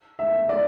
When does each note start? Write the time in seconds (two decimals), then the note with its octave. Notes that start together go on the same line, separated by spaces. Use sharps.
0.19 E5
0.49 D5